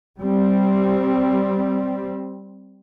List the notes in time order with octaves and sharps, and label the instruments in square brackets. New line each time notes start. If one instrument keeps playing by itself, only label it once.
[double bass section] G3 C4